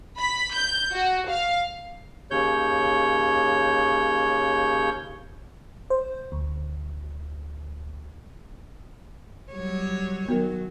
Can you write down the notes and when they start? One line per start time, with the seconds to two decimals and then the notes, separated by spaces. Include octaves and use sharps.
0.18 B5
0.55 G6
0.94 F#4
1.30 F5
2.31 D#2 C#3 C#5 G6
5.90 C5
6.32 D2
9.53 F#3 G3 C#5
10.28 D#3 F#3 B3 F#4 A#4